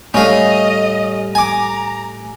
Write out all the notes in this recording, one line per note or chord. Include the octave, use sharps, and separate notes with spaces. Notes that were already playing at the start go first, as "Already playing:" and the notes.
A2 G3 A3 C#4 D#5 F5
G#5 A#5 D6